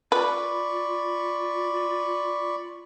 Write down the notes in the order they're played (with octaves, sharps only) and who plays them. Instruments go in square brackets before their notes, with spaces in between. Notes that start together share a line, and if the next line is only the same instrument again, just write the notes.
[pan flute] F4 [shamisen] B4 [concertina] D5 B5 C#6